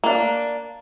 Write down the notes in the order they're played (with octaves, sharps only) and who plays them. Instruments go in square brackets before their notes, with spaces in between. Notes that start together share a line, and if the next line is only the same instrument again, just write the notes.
[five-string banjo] A#3 D4